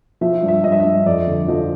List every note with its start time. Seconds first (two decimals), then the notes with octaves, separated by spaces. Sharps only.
0.21 F3 E5
0.43 G2
0.48 E5
0.64 G2 D#5
0.72 E5
0.80 G2 D#5
1.06 F2 D5
1.27 D3
1.48 F3 D#5